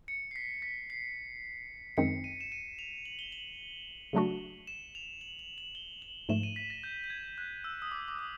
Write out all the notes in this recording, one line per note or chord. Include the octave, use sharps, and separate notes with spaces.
C#7
C7
B6
B6
C7
F#2 D#3 G#3 C4 D#4 C#7
D#7
E7
D#7
F7
F#7
G7
F#7
C#3 F#3 A3 D4 F#4
E7
F7
F#7
F#7
F#7
G7
F#7
G#2 F3 A3 E7
D#7
B6
A#6
G6
G6
G#6
F#6
E6
D#6
D6
D6
D#6